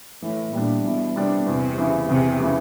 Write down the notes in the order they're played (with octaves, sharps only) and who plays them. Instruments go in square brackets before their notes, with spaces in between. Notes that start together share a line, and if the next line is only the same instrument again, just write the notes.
[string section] A2 [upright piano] E3
[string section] A#2 [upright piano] G3 B3 D4
[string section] B2 [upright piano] E3
[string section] C3 [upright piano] G3 B3 D4
[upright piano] E2 [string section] C3
[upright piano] C#3 E3
[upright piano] E2 [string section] C3
[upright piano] C#3 E3